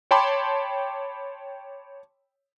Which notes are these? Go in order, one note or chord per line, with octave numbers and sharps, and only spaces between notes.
C#5 G5 A5 B5 C6 D6